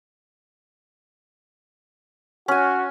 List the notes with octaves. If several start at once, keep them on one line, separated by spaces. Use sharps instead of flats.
C#4 F#4 G#5